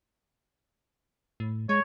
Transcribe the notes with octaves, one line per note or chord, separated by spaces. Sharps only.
A2
G#3 C#5